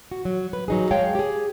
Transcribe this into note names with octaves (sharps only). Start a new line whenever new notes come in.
F#4
F#3
B4
F#3 D#4 G#4
G#3 G#4 C#5 F5 G5 A5
G4 G#4